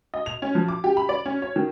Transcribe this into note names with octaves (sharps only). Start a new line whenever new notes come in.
D#5
F7
C#4
F3
D6
G4
B5
D5
C#4
C#5
D#3